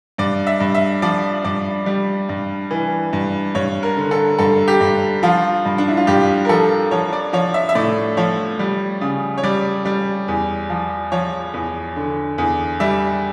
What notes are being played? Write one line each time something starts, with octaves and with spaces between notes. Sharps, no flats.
G2 D5
E5
G2
E5
F3 D5
G2 D5
G3
G2
E3
G2
G2 C#5
A#4
D3
A4
G2 A4
G4
G2
F3 F4
G2
D4
E4
F4
G2 G4
A#4
F3 A4
F3 C#5
D5
F3 C#5
E5
E5
A2 D5
F3 C#5
G3
C#3
C#5
G3 D5
G3
E2
F3
F3 C#5
E2
D3
E2
G3 E5